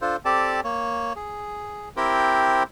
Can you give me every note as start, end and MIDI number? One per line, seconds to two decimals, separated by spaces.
0.02 0.16 62
0.02 0.16 65
0.02 0.16 69
0.02 0.16 72
0.25 0.61 60
0.25 0.61 67
0.25 0.61 69
0.25 0.61 74
0.25 0.61 81
0.64 1.13 58
0.64 1.13 73
1.16 1.89 68
1.97 2.63 60
1.97 2.63 64
1.97 2.63 67
1.97 2.63 70
1.97 2.63 72
1.97 2.63 79